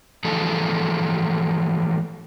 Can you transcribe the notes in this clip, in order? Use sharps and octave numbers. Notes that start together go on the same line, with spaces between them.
E3 F3 A3 G#4 A4